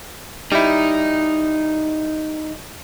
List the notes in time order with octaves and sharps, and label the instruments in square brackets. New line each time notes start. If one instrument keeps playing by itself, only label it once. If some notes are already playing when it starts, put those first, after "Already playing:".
[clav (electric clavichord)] G3 E4 [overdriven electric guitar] D#4